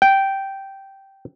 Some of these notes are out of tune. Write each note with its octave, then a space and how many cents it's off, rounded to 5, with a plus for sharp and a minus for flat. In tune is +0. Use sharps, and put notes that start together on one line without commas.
G5 -10